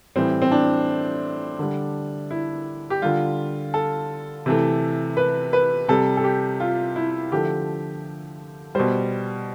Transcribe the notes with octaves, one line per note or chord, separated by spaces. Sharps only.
A2 E3 G3 C4
C4
D4
D3 G3
E4
G4
D3 G3 F4
A4
C3 E3 A3
B4
B4
C3 G3 A4
A4
G4
F4
E4
D3 F3 A3 G4
B2 G3 C5